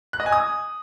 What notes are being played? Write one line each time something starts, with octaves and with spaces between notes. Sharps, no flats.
F#6
D#5
G#5
D#6